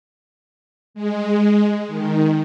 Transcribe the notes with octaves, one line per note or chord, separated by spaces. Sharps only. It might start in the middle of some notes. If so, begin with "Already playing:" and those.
G#3
D#3